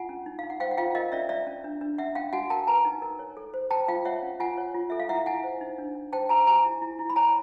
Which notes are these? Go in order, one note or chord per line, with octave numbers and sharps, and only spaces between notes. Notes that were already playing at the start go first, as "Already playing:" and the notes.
Already playing: F4 F#5 G#5
C#4
D#4
D#4 F5
F#5
C5 F5 G5
F#5
F4 F5 G5
A#4 D#5 F5
C#4 D5 E5
C#4 D5 E5
C#4
D4
D4
C#4 E5 F#5
C#4 F5 G5
F#4 F#5 G#5
A#4 G5 A5
B4 G#5 A#5
D#4
A#4
C#5
A4
C5
C5 G5 A5
F4 F5 G5
C#5 E5 F#5
C#4
F4 F#5 G#5
C#5
F4
A4 E5
F5
E4 E5 F#5
E4 F#5 G#5
C5
D#4
D4
D4
C5 G5 A5
F#4 G#5 A#5
G4 G#5 A#5
E4
E4
E4
B5
C#5 G#5 A#5